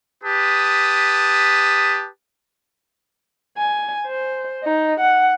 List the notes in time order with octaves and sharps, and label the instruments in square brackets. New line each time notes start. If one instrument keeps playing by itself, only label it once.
[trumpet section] G4 B4 A5 D#6
[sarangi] G#5
C5
D#4
F#5